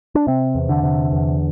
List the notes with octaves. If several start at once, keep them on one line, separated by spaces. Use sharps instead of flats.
D4
C3 C4
E2
D3
C3
E2